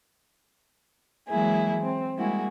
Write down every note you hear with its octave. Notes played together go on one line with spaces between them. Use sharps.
E3 F#3 G#3 A#3 E4 G#4
C4
G3 G#3 A#3 E4 F#4 G#4